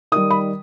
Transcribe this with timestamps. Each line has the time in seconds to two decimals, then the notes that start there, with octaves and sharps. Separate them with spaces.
0.12 D#3 D#6
0.16 G3
0.30 B5